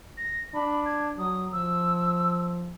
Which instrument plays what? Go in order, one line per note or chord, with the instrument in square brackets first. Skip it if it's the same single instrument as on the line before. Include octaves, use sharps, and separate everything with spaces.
[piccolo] A#6
[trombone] D4 [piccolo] B5
[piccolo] G#6
[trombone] F#3 [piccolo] D#6
[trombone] F3 [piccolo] E6